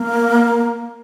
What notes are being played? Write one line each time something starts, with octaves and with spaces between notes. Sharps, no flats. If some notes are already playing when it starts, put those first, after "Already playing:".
Already playing: A#3